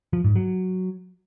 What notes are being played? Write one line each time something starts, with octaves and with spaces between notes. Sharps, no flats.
F3
G#2
F#3